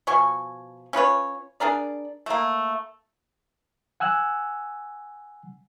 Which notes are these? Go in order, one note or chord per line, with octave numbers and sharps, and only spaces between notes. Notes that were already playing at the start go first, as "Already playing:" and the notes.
B2 F3 G#5 C#6
C#4 F4 B4 C#5
D4 G#4 A#4 D5
A3 A#3
F#5 G#5 E6 F#6